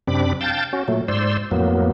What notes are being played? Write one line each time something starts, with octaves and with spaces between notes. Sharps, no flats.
F#2 C3 C4 D4 B5 D6
F5 G5 A5 G6 A6
C#4 F#4
A#2 F#3 A3
G#2 C5 D5 C6 E6
F2 A2 F#3 A#3 B3